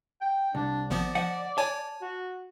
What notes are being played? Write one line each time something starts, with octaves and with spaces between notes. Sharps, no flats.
G5
C2 D4
G#1 F3 B3 D5
F3 D#5 F#5
C#5 G#5 A5
F#4